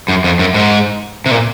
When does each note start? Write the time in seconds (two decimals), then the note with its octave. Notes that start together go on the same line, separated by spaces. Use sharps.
0.08 F#2
0.24 F2
0.39 F#2
0.54 G#2
1.26 C3
1.31 A#2